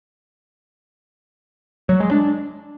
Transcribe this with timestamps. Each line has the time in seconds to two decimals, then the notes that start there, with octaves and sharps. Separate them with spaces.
1.89 F#3
2.00 G#3
2.11 D4